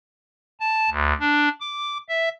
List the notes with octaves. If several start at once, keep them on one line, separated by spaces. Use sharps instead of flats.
A5
D2
D4
D6
E5